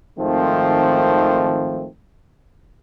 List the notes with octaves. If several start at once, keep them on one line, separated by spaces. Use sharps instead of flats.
G#1 D#3 F3 A3 C4